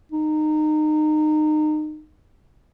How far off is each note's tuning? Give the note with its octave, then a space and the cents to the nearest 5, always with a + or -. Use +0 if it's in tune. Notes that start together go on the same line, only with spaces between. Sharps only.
D#4 -25